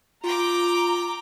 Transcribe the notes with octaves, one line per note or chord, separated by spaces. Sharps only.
F4 G5 A#5 D6